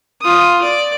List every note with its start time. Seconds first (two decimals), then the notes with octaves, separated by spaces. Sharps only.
0.21 F4 D#6
0.62 D5